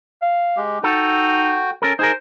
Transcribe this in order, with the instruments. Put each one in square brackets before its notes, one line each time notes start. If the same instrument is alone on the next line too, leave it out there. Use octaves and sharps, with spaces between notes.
[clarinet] F5
[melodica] G#3 G4
[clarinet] D#4 [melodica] F#4 G5 [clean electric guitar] A4
[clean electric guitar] C#4 A4 A#4
[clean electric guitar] D#4 G#4 A#4 [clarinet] C5